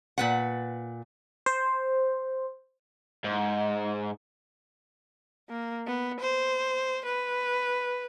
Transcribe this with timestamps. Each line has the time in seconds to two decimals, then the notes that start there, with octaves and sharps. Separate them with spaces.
0.18 A#2 B4 F#5
1.46 C5
3.24 G#2
5.49 A#3
5.87 B3
6.20 C5
7.05 B4